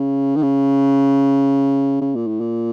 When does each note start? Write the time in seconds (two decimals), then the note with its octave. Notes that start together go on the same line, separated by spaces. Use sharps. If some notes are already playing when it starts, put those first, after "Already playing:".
Already playing: C#3
0.36 D#3
0.43 C#3
2.01 C#3
2.15 A#2
2.27 A2
2.41 A#2